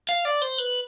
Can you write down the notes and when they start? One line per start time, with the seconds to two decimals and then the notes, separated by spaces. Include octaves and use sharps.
0.09 F5
0.25 D5
0.42 C5
0.58 B4